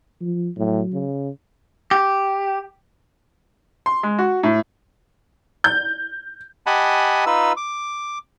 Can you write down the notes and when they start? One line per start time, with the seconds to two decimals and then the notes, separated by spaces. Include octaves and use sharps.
0.21 F3
0.57 A2 F#3
0.93 C#3
1.91 G4
3.86 C6
4.03 G#3
4.18 F#4
4.43 A2
5.64 G6
6.66 G4 D#5 F#5 G#5 A5 B5
7.26 D#4 F4 B4 E6
7.57 D6